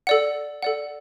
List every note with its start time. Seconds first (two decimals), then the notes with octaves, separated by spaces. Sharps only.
0.07 A4 D5 F#5
0.63 A4 D5 F#5